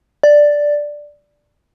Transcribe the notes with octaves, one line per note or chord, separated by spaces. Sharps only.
D5